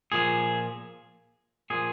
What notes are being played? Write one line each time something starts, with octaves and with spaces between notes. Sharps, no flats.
A#2 F3 G#4
A#2 F3 G#4